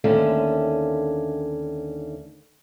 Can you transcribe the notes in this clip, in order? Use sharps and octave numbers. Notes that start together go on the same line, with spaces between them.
D#2 D3 D#3 A3 C#4